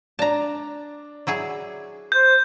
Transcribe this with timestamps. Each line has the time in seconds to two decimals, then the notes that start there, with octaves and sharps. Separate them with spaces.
0.19 D4 D5 A5 A#5
1.27 F#3 E4 G#4
2.12 C5 G6